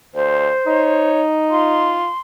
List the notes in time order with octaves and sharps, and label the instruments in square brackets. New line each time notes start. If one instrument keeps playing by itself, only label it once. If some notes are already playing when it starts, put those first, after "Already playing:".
[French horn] D2 [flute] C5
[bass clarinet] D#4 [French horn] C#5
[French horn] F4 [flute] C6